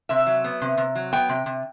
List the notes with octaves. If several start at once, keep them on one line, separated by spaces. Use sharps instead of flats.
C3 E5
F#3
B3
C3
C3
F#3
B3 G5
C3
C3